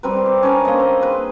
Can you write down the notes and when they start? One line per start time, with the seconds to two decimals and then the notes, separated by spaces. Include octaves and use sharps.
0.03 G3 C4 A#4 B4
0.25 D6
0.43 C#4 D4 A#4 B4
0.65 A#3 C4 D#5
0.80 C4
1.01 G#4 B4